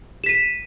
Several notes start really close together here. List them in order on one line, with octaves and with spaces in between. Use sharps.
E7 B6 D#7